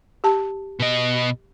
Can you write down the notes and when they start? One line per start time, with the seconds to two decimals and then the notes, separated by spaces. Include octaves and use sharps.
0.24 G4 A5
0.80 B2 D#5